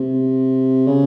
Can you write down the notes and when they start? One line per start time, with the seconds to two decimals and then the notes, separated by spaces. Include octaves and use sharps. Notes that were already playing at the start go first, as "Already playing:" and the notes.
Already playing: C3
0.87 C#3